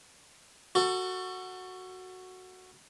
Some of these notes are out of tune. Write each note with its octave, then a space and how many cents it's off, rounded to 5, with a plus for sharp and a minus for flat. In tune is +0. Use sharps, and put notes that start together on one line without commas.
F#4 +0 A4 +30